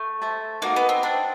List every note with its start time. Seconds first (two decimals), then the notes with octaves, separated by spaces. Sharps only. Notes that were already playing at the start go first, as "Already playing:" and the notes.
Already playing: A3
0.21 C5 E5 A5
0.62 A#3 D#4 F#4 A#4 D#5
0.76 B3
0.89 C4
1.03 D4 C5 D#5 G5